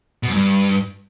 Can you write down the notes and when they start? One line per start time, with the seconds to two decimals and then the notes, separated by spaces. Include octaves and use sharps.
0.23 B2
0.29 F#2
0.34 G2